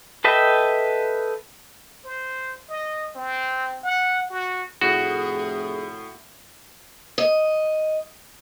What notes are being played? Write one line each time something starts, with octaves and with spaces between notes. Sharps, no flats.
A4 B4 D#5 E5 G5
C5
D#5
C4
F#5
F#4
F1 A2 F#4 G#4
D#5